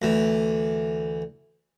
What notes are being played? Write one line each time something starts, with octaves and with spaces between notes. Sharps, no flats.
D2 E3